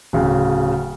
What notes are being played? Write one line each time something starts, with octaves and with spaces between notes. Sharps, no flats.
D1 C#3